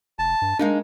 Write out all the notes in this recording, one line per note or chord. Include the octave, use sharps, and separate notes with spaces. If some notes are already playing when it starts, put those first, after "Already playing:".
F1 A5
G2
G#3 A#3 D4 D#4